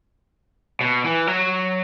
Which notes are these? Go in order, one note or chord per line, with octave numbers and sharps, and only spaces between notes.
B2
E3
F#3